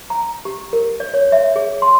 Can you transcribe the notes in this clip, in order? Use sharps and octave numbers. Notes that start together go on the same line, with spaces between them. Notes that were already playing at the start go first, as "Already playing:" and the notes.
A#5
G4
A#4
D5
C#5
E5
G#4
C6